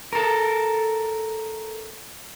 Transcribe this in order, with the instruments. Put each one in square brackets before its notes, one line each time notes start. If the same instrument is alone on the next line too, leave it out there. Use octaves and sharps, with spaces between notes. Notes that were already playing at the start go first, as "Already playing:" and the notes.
[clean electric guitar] A4 A#4